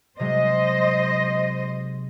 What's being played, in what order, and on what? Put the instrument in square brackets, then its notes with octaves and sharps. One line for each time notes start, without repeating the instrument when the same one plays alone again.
[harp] C3 F#3 G#3 [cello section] C5 D#5